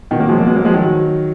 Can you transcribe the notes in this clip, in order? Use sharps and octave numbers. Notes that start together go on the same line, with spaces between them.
B2 D#3
F#3 A#3
F3 G#3
F#3 A#3
G#3 B3
F#3 A#3
F3 G#3
D#3 F#3